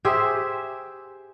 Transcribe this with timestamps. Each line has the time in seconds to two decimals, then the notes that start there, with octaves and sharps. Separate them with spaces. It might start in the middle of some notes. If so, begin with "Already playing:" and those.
0.05 G4 G#4 C5 E5